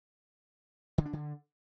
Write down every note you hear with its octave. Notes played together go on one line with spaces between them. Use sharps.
D3
D4
D3